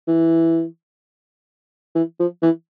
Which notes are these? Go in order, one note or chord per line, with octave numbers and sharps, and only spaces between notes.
E3
E3
F3
E3